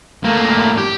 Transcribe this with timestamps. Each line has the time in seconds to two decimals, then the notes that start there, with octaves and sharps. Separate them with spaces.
0.24 A2 A#3
0.78 G4